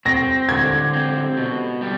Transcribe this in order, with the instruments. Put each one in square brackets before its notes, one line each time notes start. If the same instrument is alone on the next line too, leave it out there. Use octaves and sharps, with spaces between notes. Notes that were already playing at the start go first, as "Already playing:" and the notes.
[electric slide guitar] C4 [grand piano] A#6
[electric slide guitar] D3 [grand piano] G#6
[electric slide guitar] C4
B2
G3